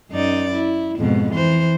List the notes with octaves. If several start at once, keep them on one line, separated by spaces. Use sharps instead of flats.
F#2 D#4 D5
E4
F2 G#2 B2
E3 C5